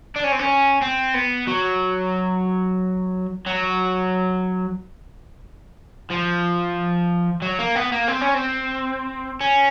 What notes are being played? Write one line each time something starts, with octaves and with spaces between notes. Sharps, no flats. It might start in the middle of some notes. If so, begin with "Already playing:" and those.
D4
C#4
C4
C#4
C4
B3
F#3
F#3
F3
F#3
A#3
B3
A#3
C4
C#4
C4
C#4